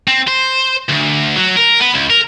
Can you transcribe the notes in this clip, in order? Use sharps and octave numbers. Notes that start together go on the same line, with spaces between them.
C4
C5
D2
F#3
A#4
B3
C#2
A#4